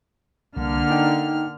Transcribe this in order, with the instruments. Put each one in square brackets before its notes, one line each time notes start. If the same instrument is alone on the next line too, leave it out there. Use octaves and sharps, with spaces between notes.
[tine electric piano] C2 [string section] D3 A#3 F6
[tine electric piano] D#4 G5